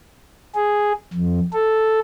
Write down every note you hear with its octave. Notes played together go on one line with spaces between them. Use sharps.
G#4
F2
A4